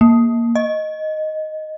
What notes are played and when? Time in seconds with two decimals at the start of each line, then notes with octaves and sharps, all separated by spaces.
0.01 A#3
0.55 D#5